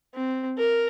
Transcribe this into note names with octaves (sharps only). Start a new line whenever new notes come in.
C4
A#4